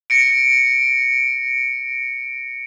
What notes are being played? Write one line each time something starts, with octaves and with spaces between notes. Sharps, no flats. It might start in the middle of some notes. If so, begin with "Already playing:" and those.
A#6 C#7 D7